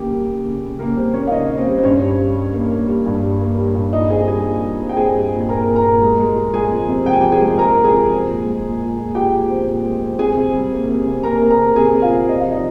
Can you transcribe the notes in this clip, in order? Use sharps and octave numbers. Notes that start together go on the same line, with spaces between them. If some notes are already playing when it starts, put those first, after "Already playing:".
Already playing: C#3 A#3 G4
G3
A#3
C#3
C#3
C#3 A#3 A#4
G3 C4 C5
A#3 C#4 C#5
F5
C#3 D#4 D#5
C#3
C4 C5
G3
C5
G2 C#4 C#5
G3
G3
G3
A#3
A#3
G3
G2
G3
A#3
G3
G2
A#2 D#4 D#5
C4 G#4 G#5
G3 G#4 G#5
A#2
G3
C4
G5
C4 G#4 G#5
G3
A#2
G#5
A#2 A#4 A#5
A#2
A#4 A#5
A#2
G#3
G#3
G#3
G#3 G#4 G#5
F2
C3
F3 G5
G#5
F3 G4 G5
G#4 G#5
G#3
F3 A#4 A#5
C3
G#4 G#5
F2
C4
A#2
G#3
A#2
A#2
A#2
A#2 G4 G5
A#2
C4
A#2
G#3
C4
C3 G#4 G#5
C3
G3
A#3
C3
C3
A#3 A#4 A#5
C3
A#4 A#5
C3
C3 G#4 G#5
C3
F4 F5
C3
C4 D#5
F5
F3
D#4 D#5